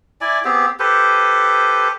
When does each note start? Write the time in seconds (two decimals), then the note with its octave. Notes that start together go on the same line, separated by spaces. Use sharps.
0.21 E4 D5 G#5
0.44 B3 C4 G4 G#4
0.79 G4 A4 B4 C5